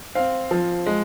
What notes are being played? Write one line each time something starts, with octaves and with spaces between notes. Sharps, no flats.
C4 F5
F3
G#3